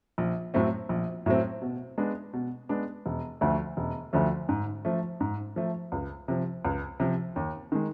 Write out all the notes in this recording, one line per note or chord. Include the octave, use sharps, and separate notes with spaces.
A#1
A2 F#3 A3 C4
A#1
A2 F#3 A3 C4
B2
G#3 B3 D4
B2
G#3 B3 D4
E1
D2 D3 F3 A3
E1
D2 D3 F3 A3
G#2
F3 A3
G#2
F3 A3
C#2
C3 F3
C#2
C3 F3
D#2
D#3 G#3